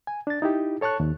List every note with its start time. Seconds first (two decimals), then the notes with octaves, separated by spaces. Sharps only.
0.07 G#5
0.27 D4 A6
0.42 D#4 E4 G4
0.81 A4 C#5 A5 C#6 F#6
1.00 D#2